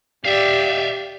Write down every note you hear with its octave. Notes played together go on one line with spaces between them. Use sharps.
G4 D5 E5 F5